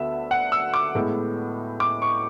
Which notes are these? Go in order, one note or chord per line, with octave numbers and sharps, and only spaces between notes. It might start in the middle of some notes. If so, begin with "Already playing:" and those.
Already playing: D2 D3 B3 E5
F#5
E6
D6
A2 G#3 B3
D6
C#6